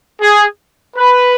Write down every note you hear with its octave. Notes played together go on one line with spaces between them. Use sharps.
G#4
B4